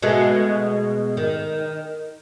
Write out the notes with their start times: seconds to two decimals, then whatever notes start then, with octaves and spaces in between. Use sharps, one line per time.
0.02 B2 G#3 A3
1.17 D#3